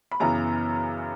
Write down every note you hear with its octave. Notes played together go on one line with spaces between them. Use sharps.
B5
F#2 C#3 E3 B3 A#5